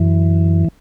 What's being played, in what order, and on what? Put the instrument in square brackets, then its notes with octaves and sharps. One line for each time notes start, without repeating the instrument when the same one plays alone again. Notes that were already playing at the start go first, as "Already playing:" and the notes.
Already playing: [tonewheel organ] F#2 E3